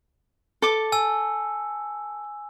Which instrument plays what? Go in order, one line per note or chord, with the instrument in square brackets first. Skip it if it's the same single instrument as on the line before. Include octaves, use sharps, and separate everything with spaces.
[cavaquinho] A4 D6
[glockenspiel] G#5 E6